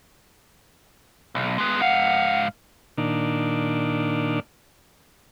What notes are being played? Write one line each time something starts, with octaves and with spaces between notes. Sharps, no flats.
B1
G#3 B3
G#2 F5 F#5
A#2 D#3 D4